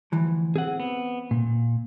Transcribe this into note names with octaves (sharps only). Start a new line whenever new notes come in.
D2 E3 F3
C4 G#4 F#5
B3
A#2